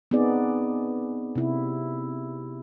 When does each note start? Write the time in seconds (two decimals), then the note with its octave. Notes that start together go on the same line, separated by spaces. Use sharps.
0.11 B3 C4 D#4 G#4 D5
1.36 C3 E4